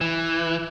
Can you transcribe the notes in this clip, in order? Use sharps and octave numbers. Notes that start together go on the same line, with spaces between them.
E3